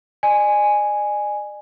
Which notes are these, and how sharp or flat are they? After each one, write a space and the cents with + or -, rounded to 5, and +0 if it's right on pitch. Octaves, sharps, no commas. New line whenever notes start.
D5 +45 G#5 +0